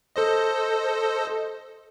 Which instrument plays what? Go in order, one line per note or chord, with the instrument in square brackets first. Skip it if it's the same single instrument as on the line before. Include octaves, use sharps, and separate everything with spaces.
[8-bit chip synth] A4 C5 D#5